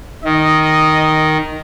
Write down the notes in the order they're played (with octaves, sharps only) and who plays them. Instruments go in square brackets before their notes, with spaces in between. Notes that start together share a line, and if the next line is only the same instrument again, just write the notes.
[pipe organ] D#3 [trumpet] D#5